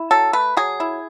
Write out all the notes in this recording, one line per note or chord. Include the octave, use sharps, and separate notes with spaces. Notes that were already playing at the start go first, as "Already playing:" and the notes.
Already playing: E4
F#3 A4
A3 B4
F#3 G#4
E4